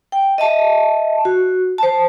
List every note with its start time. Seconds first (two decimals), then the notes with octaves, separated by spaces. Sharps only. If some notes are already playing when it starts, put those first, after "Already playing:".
0.12 G5
0.38 D#5 E5 A5
1.25 F#4
1.78 C5 A5